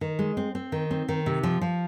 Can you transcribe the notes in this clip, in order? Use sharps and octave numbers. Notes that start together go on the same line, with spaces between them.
D#3
G#3
C4
C4
D#3
C4
D#3
C3
F3
F3